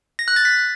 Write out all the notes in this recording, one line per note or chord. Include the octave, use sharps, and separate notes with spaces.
A#6
F#6
A6
B6